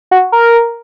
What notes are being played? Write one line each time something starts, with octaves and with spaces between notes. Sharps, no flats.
F#4
A#4